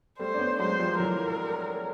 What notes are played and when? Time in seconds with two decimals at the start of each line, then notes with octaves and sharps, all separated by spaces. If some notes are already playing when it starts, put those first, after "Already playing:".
0.19 G3 A3 C5
0.34 D4
0.39 B3 C#4
0.59 F#3 G#3 C5
0.79 F3 G3
0.99 E3 F#3 A#4